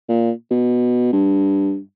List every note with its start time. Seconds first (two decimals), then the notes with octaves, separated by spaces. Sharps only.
0.09 A#2
0.51 B2
1.13 G2